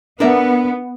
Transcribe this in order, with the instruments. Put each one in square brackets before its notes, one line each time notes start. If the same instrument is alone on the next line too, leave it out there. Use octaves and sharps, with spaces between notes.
[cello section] B3 [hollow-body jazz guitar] D4 A#4 E5